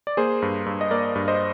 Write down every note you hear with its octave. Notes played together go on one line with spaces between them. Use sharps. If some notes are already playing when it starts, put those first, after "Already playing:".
D5
A#3 G#4 C5
G2
G2
D#5
A#3 A#4 D5
G2
C5 D#5